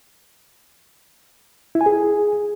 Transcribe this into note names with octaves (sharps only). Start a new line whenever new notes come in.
E4
G#5
G#4